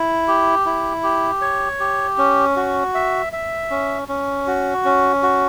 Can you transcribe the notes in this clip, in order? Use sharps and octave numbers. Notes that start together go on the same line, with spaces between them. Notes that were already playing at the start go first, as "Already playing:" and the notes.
Already playing: E4
G4
E4
G4
C#5
G4
C#4
F#4
E5
E5
C#4
C#4
F#4
C#4
F#4